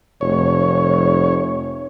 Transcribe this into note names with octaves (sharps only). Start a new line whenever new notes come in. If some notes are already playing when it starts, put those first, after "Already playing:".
F1 C#5